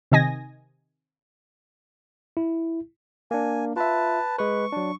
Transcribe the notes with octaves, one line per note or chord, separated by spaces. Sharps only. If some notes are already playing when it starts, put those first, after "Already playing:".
C3 D#3 D#5 G#5 A#6
E4
A#3 D4 G#5
F4 B4 E5 A5
G#3 B4 C#6
F#3 D4